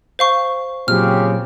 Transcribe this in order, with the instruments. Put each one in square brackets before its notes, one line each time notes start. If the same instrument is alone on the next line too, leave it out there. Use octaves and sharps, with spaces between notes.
[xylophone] C5 F5 C#6
[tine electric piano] A#2 F#3 [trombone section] C#3 C4 G4 [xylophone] F6